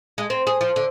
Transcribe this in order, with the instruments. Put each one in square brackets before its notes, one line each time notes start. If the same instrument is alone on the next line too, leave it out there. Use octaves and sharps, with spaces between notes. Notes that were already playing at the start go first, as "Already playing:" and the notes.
[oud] G#3
C4
G#4
F3
D3